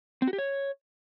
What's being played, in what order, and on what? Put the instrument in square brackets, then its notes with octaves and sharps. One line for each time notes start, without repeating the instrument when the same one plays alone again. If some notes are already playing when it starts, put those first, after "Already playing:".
[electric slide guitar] C4
F#4
G4
C#5